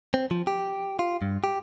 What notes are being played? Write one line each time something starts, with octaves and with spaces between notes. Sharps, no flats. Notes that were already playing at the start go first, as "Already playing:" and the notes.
C4
F3
G4
F4
G2
G4